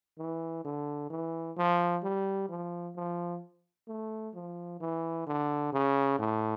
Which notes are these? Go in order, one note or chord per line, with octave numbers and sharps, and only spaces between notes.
E3
D3
E3
F3
G3
F3
F3
A3
F3
E3
D3
C#3
A2